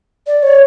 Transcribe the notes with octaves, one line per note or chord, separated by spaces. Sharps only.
D5
C#5